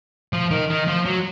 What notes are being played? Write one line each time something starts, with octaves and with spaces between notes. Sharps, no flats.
F3
D#3
D#3
F3
F#3